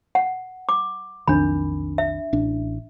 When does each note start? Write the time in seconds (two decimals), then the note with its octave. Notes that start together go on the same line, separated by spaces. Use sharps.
0.15 F#5
0.69 D6
1.28 B1 F2 D#3 D4 B5
1.98 E5
2.33 A1 D4